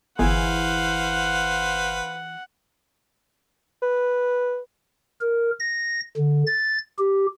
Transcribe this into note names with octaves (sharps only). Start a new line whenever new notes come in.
G1 E3 E4 G#4 B4 C5 F5 F#5
B4
A#4
A#6
D3
A6
G4